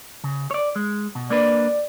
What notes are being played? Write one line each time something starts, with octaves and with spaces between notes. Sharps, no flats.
C#3
C#5 D5
G#3
B2
A#3 D4 B4 D5